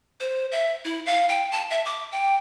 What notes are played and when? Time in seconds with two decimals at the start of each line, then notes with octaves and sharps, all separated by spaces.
0.20 C5
0.52 E5
0.85 E4
1.06 F5
1.29 G5
1.52 A5
1.70 E5
1.86 D6
2.12 G5